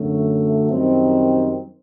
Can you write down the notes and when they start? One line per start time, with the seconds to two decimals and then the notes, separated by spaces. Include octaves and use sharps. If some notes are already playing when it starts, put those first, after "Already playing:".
Already playing: F#2 D3 F#3 A3
0.70 F#2 D#3 G3 C4